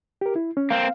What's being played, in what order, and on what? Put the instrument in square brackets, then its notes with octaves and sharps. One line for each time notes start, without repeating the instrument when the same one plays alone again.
[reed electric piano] G4 A#4
E4
C#4
[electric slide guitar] A#3 C4 [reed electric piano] F5